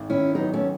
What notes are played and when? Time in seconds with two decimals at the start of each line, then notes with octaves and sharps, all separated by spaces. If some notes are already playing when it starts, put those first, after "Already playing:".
Already playing: G#1
0.09 D#3 C#4 E4
0.35 F#3 B3 D#4
0.53 A3 C#4